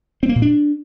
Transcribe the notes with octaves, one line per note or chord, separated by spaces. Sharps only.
C4
A#3
A#2
D4